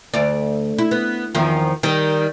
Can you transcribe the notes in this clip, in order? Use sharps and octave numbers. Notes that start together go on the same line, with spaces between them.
D2 D5
E4
B3
E2 D#3 F3
D#3 G3